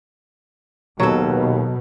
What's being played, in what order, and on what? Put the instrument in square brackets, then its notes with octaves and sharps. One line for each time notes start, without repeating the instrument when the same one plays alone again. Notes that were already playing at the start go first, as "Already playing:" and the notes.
[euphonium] D#2 [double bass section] B2 [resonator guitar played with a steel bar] F#3 A4